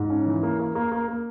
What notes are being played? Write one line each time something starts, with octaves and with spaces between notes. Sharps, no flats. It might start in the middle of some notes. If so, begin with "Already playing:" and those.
Already playing: G#2
C#4
E3
A#3
A#3
A#3
A#3
A#3